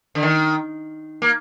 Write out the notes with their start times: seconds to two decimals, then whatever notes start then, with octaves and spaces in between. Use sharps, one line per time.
0.15 D3
0.23 D#3
1.22 A#3